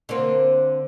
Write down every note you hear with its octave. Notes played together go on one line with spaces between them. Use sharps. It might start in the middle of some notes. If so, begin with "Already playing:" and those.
D3 A#3 C4